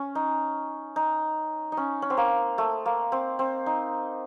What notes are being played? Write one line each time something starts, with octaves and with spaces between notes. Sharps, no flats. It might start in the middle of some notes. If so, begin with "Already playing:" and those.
Already playing: C#4
D#4
D#4
D#4
C#4
C#4
C4
A#3
A3
A#3
C4
C4
D#4